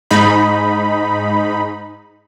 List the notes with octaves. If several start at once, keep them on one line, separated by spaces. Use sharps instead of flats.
G#2 D#4 B5